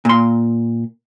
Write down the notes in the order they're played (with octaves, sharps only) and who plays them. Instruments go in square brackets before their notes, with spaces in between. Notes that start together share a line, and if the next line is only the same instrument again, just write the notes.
[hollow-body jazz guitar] A#2 C6